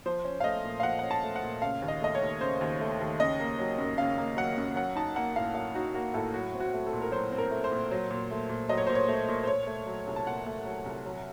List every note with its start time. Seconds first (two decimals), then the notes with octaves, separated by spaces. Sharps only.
0.06 F3 C5
0.25 C#4
0.40 F5
0.44 A3 D#5
0.64 A#2
0.80 F5
0.83 F3 F#5
0.99 C#4 F#5
1.11 A5
1.23 A3
1.36 F#5
1.43 A#2
1.62 C#3 F5
1.82 D#2
1.88 D#5
2.02 A3 D#5
2.15 C#5
2.22 D#2
2.41 C#3 C5
2.61 D#2
2.80 A3
3.00 D#2
3.20 C#3 D#5
3.40 A#3
3.59 F#3
3.78 F#2
3.98 C#3 F5
4.18 A#3
4.37 F#3 F#5
4.57 F#2
4.76 F#3 F#5
4.96 D#4 A5
5.16 A#3 F#5
5.36 A2 F5
5.55 F#3 F5
5.75 D#4 F#4
5.94 A#3 F#4
6.14 A2 A4
6.34 F#3 F#4
6.54 C4
6.60 F#4
6.73 A3
6.87 A4
6.93 A#2
7.02 A#4
7.12 F#3 C5
7.32 C4
7.38 A#4
7.51 A3
7.64 C5
7.72 A#2
7.91 F#3
8.10 A#2
8.31 A3
8.49 A#2
8.69 F#3 D#5
8.78 C#5
8.87 A#2 C5
8.95 C#5
9.08 A3
9.28 A#2
9.44 C5
9.47 A#2 C#5
9.67 A3
9.87 F#3
10.07 C2
10.16 A5
10.27 A#2 F#5
10.46 A3
10.65 F#3
10.86 C2
11.06 F#3